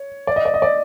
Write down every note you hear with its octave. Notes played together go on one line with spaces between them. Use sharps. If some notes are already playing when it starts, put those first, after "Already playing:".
Already playing: C#5
D5
D#5
D5
D#5
D5